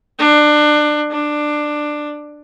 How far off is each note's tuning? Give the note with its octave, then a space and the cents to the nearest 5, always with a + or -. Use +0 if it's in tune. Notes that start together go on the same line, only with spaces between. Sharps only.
D4 +25
D4 +15